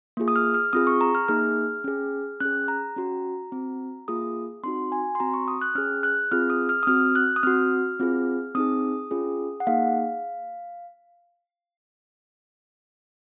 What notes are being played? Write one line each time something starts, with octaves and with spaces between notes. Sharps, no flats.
A#3 F4 G#4
D#6
F6
F6
C4 F4 G#4 D#6
C#6
A#5
F6
A#3 D#4 G#4 F6
C#4 G#4
C#4 G#4 F#6
A#5
C#4 F#4
C4 F#4
A#3 F4 G#4 D#6
C4 D#4 F#4 C6
G#5
C6
C4 F#4 A#5
C#6
D#6
F#6
C#4 G#4 F6
F#6
C4 F4 G#4 F6
D#6
F6
D#6
C4 F#4 F6
F#6
D#6
C4 F#4 F6
C4 F4 G#4
C4 D#4 G#4 D#6
C#4 F4 G#4
F#5
A#3 D#4 G#4 F5